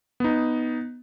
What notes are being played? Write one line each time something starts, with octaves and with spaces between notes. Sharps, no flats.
B3 D#4